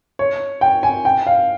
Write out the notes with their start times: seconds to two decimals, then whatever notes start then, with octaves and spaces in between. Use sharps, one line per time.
0.19 C#5
0.61 G5
0.83 G#5
1.05 G5
1.27 F5